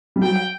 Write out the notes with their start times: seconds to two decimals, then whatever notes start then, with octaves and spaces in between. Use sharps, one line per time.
0.16 G3
0.22 F#3 G5